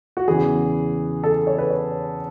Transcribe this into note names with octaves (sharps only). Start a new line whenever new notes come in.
F#4
E2 C#3 E3 G#4
A4
C#5
B4
C#5